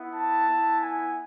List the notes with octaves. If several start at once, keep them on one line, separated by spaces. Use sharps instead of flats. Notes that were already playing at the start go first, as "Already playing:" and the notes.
Already playing: B3 E4
A5
B3 E4
G#5